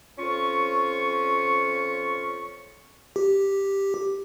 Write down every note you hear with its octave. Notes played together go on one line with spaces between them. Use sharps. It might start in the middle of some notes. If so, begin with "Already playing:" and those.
F2 C#4 F4 C#6
G4